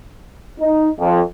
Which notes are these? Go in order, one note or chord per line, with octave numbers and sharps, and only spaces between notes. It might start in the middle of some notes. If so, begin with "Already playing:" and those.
D#4
F2